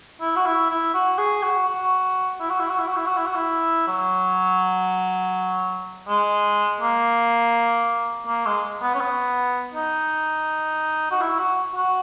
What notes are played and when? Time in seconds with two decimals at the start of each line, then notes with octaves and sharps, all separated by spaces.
0.21 E4
0.36 F#4
0.45 E4
0.70 E4
0.94 F#4
1.18 G#4
1.43 F#4
1.68 F#4
2.40 E4
2.50 F#4
2.59 E4
2.69 F#4
2.79 E4
2.87 F#4
2.97 E4
3.06 F#4
3.16 E4
3.26 F#4
3.35 E4
3.87 F#3
6.08 G#3
6.81 A#3
8.27 A#3
8.46 G#3
8.82 B3
8.95 C#4
9.00 B3
9.74 D#4
11.11 F#4
11.21 E4
11.39 F#4
11.76 F#4